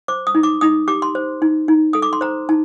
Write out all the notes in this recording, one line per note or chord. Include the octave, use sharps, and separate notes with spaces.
C5 D6
D#6
D#4
D6
D#4 D#6
G4 D6
C6
C5
D#4
D#4
A4 D#6
D6
C6
C5 A#5
D#4 A5